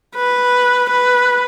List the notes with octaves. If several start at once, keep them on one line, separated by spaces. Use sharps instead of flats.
B4
B4